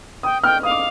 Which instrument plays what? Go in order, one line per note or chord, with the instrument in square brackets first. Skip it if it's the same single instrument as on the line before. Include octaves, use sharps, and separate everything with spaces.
[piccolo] G5 [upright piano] D#6
[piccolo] G5 [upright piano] F6
[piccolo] F5 [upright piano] D#6
[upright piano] D6